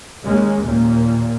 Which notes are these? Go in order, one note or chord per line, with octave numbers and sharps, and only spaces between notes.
D#2 G#3 A#3 C#4
D#2 A#2 A#3